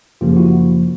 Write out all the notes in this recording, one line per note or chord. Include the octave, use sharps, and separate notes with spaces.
F#2 C#3 F3 A#3 F4 G4
E4 F#4